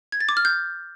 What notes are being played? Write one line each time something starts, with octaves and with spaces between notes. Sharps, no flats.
G#6
A6
D6
F6
G6